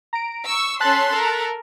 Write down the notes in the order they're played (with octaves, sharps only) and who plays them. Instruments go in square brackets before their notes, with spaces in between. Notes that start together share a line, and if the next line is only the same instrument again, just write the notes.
[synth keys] A#5 D7
[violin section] C#6 E6
[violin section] C#4 A4 C6 [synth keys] A5 F#6 B6
[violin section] A4 A#4